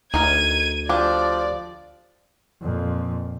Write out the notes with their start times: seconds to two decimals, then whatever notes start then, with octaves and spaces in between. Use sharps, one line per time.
0.14 D2 D#4 A#4 G#6 D#7
0.89 F3 D4 G4 D5
2.61 F2 A#2